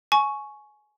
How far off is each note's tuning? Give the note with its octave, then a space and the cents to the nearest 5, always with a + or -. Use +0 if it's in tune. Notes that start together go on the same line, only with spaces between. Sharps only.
G#5 +20 C#6 +0